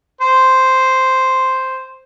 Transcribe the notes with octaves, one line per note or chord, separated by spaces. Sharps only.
C5